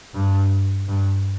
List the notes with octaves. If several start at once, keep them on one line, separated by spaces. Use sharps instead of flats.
G2
G2